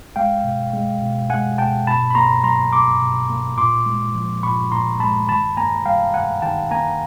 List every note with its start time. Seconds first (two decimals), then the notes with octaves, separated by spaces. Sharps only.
0.16 G#3 F5 G5
0.44 B2
0.73 G#3
1.02 B2
1.30 G#3 F#5 G#5
1.58 B2 G5 A5
1.87 B2 A5 B5
2.10 B5
2.15 A#3 A#5 C6
2.43 F#3 A#5 C6
2.73 B2 C6 D6
3.01 B2
3.30 A#3
3.58 A#2 C6 D6
3.86 G#3
4.15 F3
4.43 A#2 B5 C#6
4.71 A#2 A#5 C6
5.00 G#3 A5 B5
5.29 D#3 A5 B5
5.57 A#3 G#5 A#5
5.85 G3 F5 G5
6.14 D#3 F#5 G#5
6.42 D#3 G5 A5
6.71 A#3 G#5 A#5